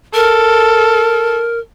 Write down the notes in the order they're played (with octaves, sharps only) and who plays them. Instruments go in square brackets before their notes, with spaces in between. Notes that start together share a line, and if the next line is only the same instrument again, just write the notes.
[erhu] A4 [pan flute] A#4